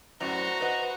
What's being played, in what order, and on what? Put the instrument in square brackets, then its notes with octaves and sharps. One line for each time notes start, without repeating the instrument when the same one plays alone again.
[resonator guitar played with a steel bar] F#2 A2 D5 [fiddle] F#4 C5 [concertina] A#5
[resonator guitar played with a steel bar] B4 D#5 F#5